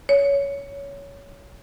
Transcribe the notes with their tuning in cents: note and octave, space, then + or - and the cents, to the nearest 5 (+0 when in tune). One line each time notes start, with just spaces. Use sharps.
C#5 +15